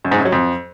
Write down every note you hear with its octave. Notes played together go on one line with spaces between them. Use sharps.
F#2
G#2
F#2
F#3
F2